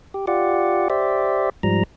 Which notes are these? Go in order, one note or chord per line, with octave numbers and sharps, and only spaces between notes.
G4
F4 G4 D5 F#5
G4 C5 D5 E5
G#2 F3 G3 A#5